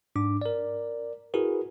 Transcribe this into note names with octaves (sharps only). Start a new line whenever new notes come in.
G#2 D4 D6
A#4 D5
E4 F#4 G#4 A#4 B4